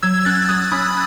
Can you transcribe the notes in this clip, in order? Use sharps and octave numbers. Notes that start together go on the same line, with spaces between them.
F#3 E6 G#6
C#4 F#6 A6
F#3 D#6 F#6
C#4 B5 D#6